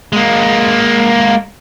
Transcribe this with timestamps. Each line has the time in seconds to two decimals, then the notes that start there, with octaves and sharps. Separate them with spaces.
0.13 G#3 A#3